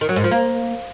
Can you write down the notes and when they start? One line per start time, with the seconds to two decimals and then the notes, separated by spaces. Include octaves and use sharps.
0.01 D#3
0.09 F#3
0.16 G#2
0.24 F3
0.31 A#3